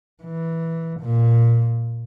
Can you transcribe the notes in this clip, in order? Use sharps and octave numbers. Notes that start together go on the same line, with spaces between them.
E3
A#2